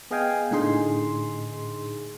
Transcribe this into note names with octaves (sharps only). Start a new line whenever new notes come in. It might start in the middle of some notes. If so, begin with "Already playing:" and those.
B3 G#4 D#5 F5 G5 G#5
A2 D3 D#4 G#4 C6